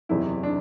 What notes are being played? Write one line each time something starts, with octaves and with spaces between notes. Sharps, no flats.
F#1 E2 C3 E4
D4